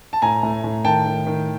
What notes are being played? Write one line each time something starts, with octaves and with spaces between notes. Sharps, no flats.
A5
A2 G#5 A#5
A2
A2
D#3 G5 A5
D#3
D#3